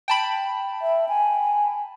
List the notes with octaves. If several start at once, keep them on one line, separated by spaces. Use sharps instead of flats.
G5 A5 B5
E5
G#5